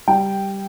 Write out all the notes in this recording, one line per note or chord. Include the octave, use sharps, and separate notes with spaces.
G3 G5